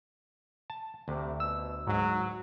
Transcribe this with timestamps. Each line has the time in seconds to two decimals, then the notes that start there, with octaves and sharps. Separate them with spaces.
0.70 A5
1.08 D2 C3
1.40 B2 E6
1.87 G#2 F#3